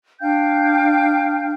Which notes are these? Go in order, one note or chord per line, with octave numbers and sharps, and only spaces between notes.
D4 F5 G5 G6